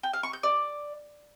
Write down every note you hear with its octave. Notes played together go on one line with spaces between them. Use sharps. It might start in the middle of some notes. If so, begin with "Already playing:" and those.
G5
F5
C#6
G6
D5